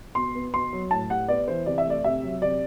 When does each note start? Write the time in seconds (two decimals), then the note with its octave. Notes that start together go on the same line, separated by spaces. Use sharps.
0.15 B2 C6
0.35 B3
0.54 B2 C6
0.73 F#3
0.91 A2 A5
1.10 G3 F#5
1.28 B3 D5
1.48 E3 C5
1.66 C3 D5
1.78 E5
1.86 A3 D5
2.04 C3 E5
2.23 F#3
2.42 C3 D5